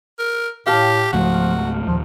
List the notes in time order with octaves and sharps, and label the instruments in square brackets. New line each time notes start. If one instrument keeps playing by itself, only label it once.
[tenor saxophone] A#4
[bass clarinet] A2 [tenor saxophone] G4 [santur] F5 A5
[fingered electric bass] C#2 G#2 A3 [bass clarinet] F3 [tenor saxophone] F#4
[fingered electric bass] D#2 A#2 [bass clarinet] F3